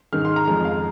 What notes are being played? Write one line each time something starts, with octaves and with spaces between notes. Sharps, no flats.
G#2 D#3 G#3 F6
C6
A#5
F2 F3 G#3 A#5
F5